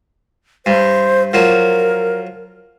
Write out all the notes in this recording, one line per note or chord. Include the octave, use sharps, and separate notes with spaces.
G2 C5
F3 F#3 A#4